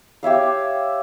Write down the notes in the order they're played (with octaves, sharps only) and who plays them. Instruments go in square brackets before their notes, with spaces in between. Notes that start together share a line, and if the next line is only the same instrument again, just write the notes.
[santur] G4 C#5 E5 F5